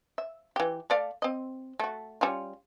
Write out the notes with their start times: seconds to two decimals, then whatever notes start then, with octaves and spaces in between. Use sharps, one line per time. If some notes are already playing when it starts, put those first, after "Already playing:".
0.18 E5
0.56 E3 G4
0.90 A3 D5 F5
1.22 C4 D#5
1.80 A3 F#4
2.21 G3 C#4 F4